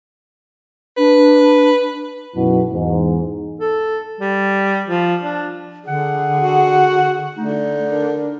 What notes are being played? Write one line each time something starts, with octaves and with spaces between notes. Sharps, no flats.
D4 B4
B1 F#2 B2 E4
E2 G#2
A4
G3
F3
D4
D3 G#4 F#5
F#4
D3 A3 D#4
D4 A#4